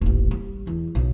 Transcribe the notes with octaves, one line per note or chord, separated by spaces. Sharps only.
D#1 A1
G3
E2
B1 D#3